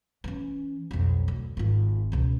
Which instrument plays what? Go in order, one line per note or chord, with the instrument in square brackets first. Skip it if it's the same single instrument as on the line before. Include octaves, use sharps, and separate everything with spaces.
[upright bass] E3 C#4
B1 F2
D2
G#1 F4
C#2 B2